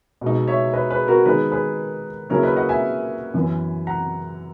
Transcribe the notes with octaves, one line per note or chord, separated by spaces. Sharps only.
B2 G#3 D#4
C#5 E5
B4 D#5
G#4 B4
F#4 A#4
D#3 G#3 B3 D#4 G#4 B4
G#4 B4
C#3 F#3 A#3 C#4 E4 A#4 C#5
B4 D#5
D#5 F#5
E5 G#5
F#2 E3 B3
F#5 A#5